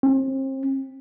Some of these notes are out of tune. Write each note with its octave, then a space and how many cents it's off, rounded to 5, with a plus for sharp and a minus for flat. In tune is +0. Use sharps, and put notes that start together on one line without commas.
C4 +35